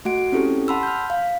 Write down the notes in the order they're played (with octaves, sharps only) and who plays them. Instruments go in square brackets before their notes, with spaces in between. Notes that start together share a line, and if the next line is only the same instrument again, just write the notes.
[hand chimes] A3 F#4 F#5 D7
C4 C#4 E4 G4 A4
F#5 A5 B5 C6 E6
F6 G6
F5